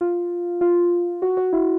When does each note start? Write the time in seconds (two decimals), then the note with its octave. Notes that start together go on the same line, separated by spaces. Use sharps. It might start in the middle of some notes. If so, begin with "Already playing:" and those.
0.01 F4
0.61 F4
1.22 F#4
1.37 F#4
1.53 E4